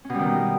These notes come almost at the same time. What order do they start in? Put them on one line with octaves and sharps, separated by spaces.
C#4 B2 G3 D#3